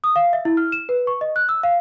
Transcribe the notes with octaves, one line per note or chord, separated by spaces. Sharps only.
D#6
F5
E5
E4
F6
E7
B4
C#6
D#5
F#6
E6
F5